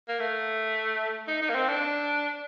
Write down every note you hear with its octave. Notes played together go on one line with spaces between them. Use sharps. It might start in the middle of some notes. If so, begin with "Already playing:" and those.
A#3
A3
D#4
D#4
A#3
C4
D4